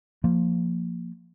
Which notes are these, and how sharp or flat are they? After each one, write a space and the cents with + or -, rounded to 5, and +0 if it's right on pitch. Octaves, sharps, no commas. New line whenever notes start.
F3 +0 A#3 -10